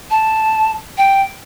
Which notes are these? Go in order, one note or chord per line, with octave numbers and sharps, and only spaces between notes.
A5
G5